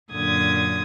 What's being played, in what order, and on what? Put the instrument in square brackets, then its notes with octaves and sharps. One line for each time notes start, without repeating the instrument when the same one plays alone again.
[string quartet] F#2 A#2 D3 D#6 G#6